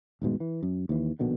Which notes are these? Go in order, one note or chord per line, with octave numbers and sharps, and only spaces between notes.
D#1 G#2 B2 G#3
E3
F#2
D#2 E3
A#1 B2 D3 D#3